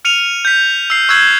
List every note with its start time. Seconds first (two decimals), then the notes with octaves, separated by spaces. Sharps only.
0.05 F6 C#7 D#7 F7
0.45 G6 B6
0.90 E6 C7
1.09 C#6 E6 F#6 G#6 C7 F#7